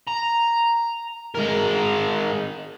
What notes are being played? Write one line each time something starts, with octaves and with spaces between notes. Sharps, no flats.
A#5
G#3 A#4